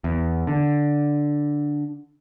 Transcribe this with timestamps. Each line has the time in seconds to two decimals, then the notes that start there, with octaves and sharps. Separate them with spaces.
0.04 E2
0.47 D3